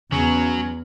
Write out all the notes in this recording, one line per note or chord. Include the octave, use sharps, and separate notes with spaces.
E2 C#3 F#3 C#4